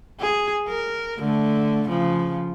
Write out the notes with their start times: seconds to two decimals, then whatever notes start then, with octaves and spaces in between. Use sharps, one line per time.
0.20 G#4
0.68 A#4
1.19 D3 A3
1.88 C#3 F3